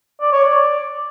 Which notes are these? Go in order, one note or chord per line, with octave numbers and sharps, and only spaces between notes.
D5
C#5
D5